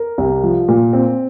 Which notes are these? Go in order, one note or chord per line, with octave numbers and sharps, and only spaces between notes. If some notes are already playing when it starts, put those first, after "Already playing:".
Already playing: A#4
C2
F3
A#2
C4